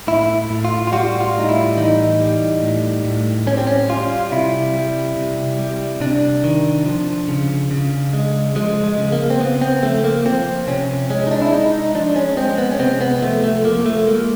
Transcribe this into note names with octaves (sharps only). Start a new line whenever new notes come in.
A2 E4
A2
F4
F4
G3 F#4
F4
A2 D#4
E4
E3 D#4
G3
A2
A2
G3 C#4
C4
C#4
G3 F4
C3 E4
G3
C3
G3
C3 D4
D#3
F3
C#3
C#3
G#3
F3 G#3
G#3
C#3
A#3
C4
C#3 B3
C4
F3 A3
A#3
F3 C4
C3 C#4
G#3 C#4
D#4
D4
E4
G#3 D#4
D#4
F3 D4
C#4
G#3 C4
B3
C#4
C3 C4
B3
F3 A3
A3
F3 A#3
A3
G#3 A#3